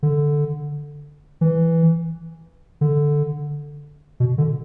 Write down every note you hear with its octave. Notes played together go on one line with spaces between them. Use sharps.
D3
E3
D3
B2
D3